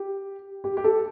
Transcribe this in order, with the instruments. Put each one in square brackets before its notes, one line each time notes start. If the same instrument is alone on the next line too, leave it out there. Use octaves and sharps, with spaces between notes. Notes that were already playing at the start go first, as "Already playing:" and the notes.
Already playing: [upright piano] G4
G4
G4
A4